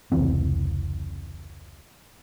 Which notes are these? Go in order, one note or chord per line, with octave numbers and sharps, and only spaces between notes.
F1 C#2 E3 C4